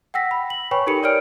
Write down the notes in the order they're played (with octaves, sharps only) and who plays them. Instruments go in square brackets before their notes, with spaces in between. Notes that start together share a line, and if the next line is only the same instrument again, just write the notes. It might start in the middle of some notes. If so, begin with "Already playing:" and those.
[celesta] F#5 G5 E6 A#6 B6
B5
F#7
B4 C#5 G5 G#5 B5 C#6
D#4 G4 A4 A#4 B5 C#7
A#4 C#5 D5 G5 F6 D7